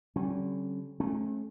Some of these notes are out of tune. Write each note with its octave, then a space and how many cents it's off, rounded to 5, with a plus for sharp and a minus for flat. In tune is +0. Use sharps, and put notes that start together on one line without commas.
D3 -40 G3 -45 C#4 -35
A3 -30 C#4 -35